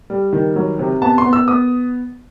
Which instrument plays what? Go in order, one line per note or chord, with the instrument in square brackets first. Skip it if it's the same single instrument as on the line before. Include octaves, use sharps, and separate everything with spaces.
[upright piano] G3
D#3
F#3
C3
B3 A5
C6
B3
E6
B3 D#6